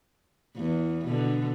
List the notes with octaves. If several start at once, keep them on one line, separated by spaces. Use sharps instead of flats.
E2
B2 D3